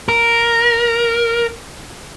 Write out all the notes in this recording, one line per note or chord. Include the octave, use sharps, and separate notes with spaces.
A#4